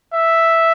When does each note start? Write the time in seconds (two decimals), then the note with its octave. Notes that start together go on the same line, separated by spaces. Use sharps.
0.14 E5